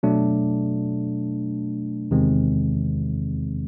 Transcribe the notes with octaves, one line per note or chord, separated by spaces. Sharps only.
B2 F#3 A3 D4
E2 C3 D#3 G#3 C4